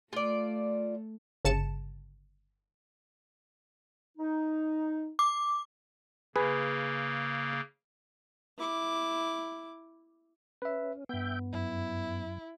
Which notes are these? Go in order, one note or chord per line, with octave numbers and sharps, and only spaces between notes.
A3 F4 D5
G1 C#3 A5 A6 C#7 E7
D#4
D6
C#3 A#3 G#4 B4
E4 D6
C#4 B4 E5
G2 B3 E5 G5 G6
F#2 E4